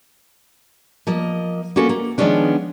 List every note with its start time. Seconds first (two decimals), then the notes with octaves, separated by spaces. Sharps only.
1.07 F3 A#3 D#5
1.76 A#3 B3 C#4 F#4 A4
1.89 A#3
2.18 D#3 F3 G#3 B3 C#4 D4